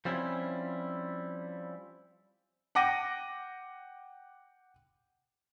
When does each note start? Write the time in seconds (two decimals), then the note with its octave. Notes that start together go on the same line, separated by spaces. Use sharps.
0.05 F3 G3 C4 C#4 E4
2.75 F#5 G5 D6 A#6 D#7